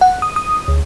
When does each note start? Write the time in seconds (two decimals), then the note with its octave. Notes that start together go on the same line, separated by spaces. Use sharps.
0.01 F#5
0.22 D#6
0.36 D#6
0.68 D2